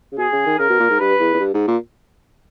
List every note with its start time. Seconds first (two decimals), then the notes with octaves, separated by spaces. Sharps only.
0.12 C#3
0.18 B2 G#4
0.33 C#3
0.46 D#3
0.59 C#3 A#4
0.70 B2
0.80 A#2
0.90 G#2
1.00 G2 B4
1.20 E2
1.34 E2
1.40 G2
1.54 G#2
1.68 A#2